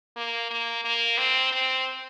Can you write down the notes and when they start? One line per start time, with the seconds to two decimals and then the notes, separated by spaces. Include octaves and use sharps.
0.16 A#3
0.50 A#3
0.84 A#3
1.18 C4
1.52 C4